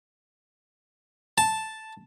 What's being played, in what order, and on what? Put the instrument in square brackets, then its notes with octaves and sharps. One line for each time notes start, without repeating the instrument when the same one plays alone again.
[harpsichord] A5